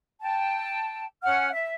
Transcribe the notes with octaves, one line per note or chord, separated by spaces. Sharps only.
G5 A5
C#4 F#5 F6
E5